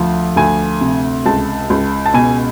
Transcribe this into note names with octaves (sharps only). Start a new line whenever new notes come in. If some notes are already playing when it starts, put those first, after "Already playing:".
Already playing: D2 F3
D2 G#5
C3
C#2 A5
C#2
A5
B2 G#5